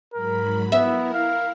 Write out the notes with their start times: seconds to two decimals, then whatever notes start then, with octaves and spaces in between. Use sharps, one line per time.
0.14 G#2 F#3 A#4 B5
0.72 B3 E4 A#4 E5
1.13 F5